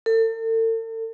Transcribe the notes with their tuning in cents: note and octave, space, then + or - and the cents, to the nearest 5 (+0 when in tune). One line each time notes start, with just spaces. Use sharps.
A4 +40